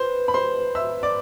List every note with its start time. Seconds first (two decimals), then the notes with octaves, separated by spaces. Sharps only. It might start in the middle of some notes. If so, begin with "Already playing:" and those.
Already playing: B4 C5 C6
0.28 B5
0.34 C5 C6
0.75 E5 E6
1.03 D5 D6